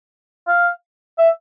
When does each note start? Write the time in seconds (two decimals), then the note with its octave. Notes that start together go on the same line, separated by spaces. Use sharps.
0.48 F5
1.18 E5